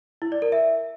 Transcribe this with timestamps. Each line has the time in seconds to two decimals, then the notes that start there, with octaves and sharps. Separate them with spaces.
0.22 E4
0.32 D5
0.42 A#4
0.52 E5